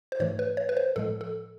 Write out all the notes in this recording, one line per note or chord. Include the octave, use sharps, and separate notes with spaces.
C5
G#2 E3 A3 C#5
B4
C#5
B4
C5
A2 F3 G#3 A4
A4